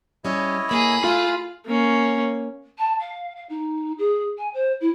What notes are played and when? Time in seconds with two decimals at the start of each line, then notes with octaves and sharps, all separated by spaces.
0.25 G3 C#4 E4 G4 C#5 D#5
0.69 A2 A#3 G#4 B5
1.04 A3 F4 F5 F6
1.66 A#3 C#4
2.78 A5
2.99 F5
3.35 F5
3.49 D#4
3.98 G#4
4.37 G#5
4.53 C5
4.80 E4